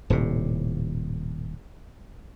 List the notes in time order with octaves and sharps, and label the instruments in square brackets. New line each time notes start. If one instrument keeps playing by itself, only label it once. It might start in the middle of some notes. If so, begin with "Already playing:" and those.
[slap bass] D#1 A2 C3